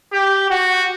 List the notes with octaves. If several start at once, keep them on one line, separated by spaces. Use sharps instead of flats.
G4
F#4